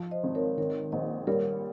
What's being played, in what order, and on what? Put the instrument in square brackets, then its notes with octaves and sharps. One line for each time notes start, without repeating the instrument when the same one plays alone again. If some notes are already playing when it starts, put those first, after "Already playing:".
Already playing: [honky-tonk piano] F3
[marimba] C5 D#5
[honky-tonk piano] G#1
[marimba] A#4 C#5
[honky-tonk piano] D#3 [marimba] A#4 C#5
[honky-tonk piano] A#1 [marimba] C5 D#5
[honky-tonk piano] G3 [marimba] A#4 C#5